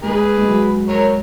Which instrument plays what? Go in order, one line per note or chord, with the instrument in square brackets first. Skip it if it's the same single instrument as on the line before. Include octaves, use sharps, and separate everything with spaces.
[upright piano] G#3 [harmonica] G#4 B4
[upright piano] G#3
F#3
[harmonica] A#4 C#5